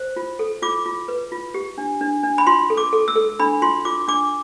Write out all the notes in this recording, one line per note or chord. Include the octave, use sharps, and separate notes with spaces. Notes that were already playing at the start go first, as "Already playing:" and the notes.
Already playing: C5
F4
A4
F4 D6
F4
B4
F4
G4
D4
D4
D4
B5
F4 C6
A4
D6
A4
E6
A4
D4 B5
F4 C6
F4 D6
D4 D6